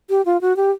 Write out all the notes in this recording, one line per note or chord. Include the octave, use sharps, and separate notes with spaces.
G4
F4
F#4
G4